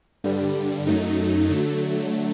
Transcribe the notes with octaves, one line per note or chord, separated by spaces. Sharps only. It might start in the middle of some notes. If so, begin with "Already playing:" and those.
G2 D3 G3
F#2 F#3 A3 D#4
D3 F#3 A3